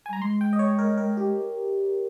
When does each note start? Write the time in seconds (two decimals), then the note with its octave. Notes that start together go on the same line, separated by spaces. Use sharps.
0.06 G#5
0.10 G3 A#5
0.21 G#3 C6
0.41 G5
0.53 D#5
0.59 C#5
0.79 A#4
0.98 A#4
1.17 G4